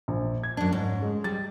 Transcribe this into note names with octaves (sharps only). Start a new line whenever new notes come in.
A#1
G#6
F#2 D4
G#2 C#4
G#3
G3 A6